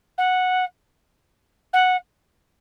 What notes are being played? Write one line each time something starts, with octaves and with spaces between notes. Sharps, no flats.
F#5
F#5